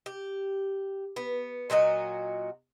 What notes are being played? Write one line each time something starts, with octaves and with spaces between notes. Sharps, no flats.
G4
B3
A#2 F#3 F#4 D#5